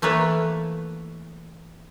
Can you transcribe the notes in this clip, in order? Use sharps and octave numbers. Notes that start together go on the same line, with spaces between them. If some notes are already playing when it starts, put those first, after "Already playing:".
E3 A3 A#3 B4 C#5